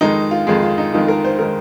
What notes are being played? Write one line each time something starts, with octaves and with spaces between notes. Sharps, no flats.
F2 D#3 G#3 D#4
F4
F2 D#3 G#3 G#4
F4
D#4
F2 D#3 G#3 F4
A#4
C5
D#3 G#3 A#4